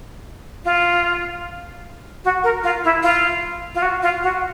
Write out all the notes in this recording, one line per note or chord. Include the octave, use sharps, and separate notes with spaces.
F4
F#4
A#4
F4
E4
F4
F4
F#4
F4
F#4